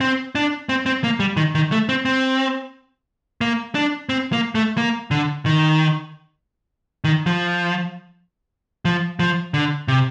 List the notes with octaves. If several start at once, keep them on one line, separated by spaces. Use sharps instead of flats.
C4
D4
C4
C4
A#3
G3
D#3
D#3
A3
C4
C4
A#3
D4
C4
A#3
A3
A#3
D3
D#3
D#3
F3
F3
F3
D3
C3